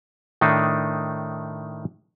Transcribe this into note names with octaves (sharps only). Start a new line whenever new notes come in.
A2 D#3 A3 D4 D#4